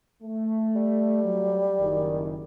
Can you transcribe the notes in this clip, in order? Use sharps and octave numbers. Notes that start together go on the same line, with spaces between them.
A3
G3
F#3
F#1 D#3